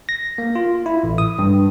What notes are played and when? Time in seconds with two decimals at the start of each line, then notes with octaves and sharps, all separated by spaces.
0.09 A#6
0.38 A#3
0.55 F4
0.86 E4
1.03 A1
1.18 D#6
1.39 G2